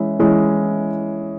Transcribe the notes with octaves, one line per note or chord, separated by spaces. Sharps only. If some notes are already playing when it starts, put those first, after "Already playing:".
Already playing: E3 G#3 C#4 E4
E3 G#3 C#4 E4